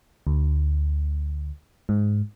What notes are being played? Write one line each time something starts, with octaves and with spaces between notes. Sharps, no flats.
D2
G#2